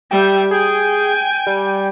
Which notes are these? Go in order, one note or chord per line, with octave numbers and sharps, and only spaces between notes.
G3 E5 G5
G#4 G5 G#5
G3